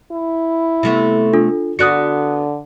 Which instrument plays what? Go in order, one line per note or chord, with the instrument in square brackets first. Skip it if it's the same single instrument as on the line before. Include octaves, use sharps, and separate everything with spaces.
[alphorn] E4
[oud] C3 A3 B3
[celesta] D4 F4 A4
[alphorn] D3 [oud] B3 D4 F#4 [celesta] D#6 F#6 C#7